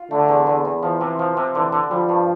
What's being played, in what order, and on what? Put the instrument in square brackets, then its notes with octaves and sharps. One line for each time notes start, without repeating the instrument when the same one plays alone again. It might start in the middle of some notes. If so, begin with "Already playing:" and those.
Already playing: [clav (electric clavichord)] F4
[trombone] D3 [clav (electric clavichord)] A3
[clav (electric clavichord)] E2
E2
E2
[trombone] E3 [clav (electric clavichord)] F3
[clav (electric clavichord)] C3
F3
C3
[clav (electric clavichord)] D3 [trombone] E3
[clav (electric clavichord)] D3
[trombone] F3 [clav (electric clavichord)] G3
[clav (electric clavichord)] G2